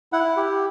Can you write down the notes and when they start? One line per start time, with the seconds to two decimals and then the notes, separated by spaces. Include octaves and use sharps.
0.13 E4 F#5
0.37 G4